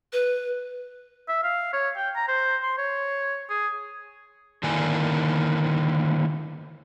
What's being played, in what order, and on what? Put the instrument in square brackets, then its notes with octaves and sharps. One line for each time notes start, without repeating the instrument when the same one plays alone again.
[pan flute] B4
[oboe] E5
F5
C#5
G5
A#5
C5
C6
C#5
G#4
[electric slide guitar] D3 D#3 A#3 D4 E4 G#5